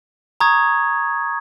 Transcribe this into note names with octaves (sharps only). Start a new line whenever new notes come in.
A#5 C#6 D#6 G#6